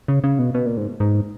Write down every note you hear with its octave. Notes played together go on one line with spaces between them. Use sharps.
C#3
C#3
B2
B2
A#2
G#2
G#2